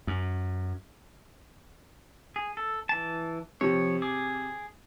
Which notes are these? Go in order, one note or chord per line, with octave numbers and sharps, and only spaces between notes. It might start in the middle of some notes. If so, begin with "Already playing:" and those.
F#2
G#4
A4
E3 A5
C3 F3 C#5
G#4 D6